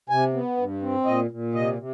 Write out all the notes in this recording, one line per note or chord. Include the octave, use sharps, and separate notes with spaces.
C3 G#5
B3
G2
C4
A#2 D#5
A#2
C3 D#5
C3